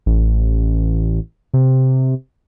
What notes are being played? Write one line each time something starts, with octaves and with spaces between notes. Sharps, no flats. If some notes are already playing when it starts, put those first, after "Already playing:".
A1
C3